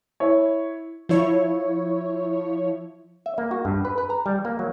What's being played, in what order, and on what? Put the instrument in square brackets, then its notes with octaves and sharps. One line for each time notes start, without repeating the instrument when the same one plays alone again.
[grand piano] E4 C#5
[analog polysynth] F3 E4 C#5
[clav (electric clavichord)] E5
A#3
F#4
G2
B4
B4
A#5
G3
A#3
F#3